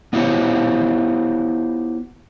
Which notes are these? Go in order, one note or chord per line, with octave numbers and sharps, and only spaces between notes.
B3 E4 F4 G4 C5 C#5